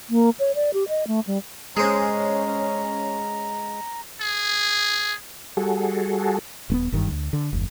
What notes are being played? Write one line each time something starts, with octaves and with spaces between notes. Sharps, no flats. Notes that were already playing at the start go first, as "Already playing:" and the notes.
A#3
C#5
D5
G4
D#5
A3
G3
G#3 C#4 G#4 C5 A#5
G#4
G3 F#4 G#4 A4
D#1 A#3 B3
F#1 G2 D#3
D2
D3
F#1 D#2